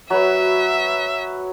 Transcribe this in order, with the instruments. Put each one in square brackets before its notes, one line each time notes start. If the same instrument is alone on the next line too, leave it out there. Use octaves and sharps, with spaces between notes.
[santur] F#3 F#4 B4 [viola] E5